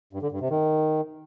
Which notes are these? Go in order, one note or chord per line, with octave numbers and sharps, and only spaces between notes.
G2
D3
G2
C3
D#3